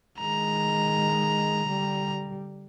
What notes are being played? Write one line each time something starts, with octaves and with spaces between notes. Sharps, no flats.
D#3 G#3 A#5
D3 G3